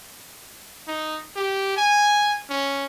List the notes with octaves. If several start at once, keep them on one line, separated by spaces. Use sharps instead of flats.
D#4
G4
G#5
C#4